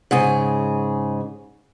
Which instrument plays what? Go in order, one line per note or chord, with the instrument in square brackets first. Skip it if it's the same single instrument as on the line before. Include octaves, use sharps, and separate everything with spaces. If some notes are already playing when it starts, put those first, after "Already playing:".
[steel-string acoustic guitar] G#2 C#3 G#4